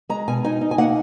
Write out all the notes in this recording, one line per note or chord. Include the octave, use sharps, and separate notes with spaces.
G#3 A#5
B2 G#5
D#4 G#5
D#4
G#5
A#3 F#5